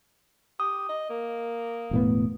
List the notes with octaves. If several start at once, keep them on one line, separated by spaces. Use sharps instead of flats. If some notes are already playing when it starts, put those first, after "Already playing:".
G4 D#6
D#5
A#3
E1 A2 B3